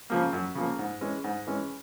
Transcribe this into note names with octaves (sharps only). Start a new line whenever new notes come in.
C#3 F3 A#3
F#2
C#3 F3 A#3
G#2
E3 G#3 C#4
G#2
E3 G#3 C#4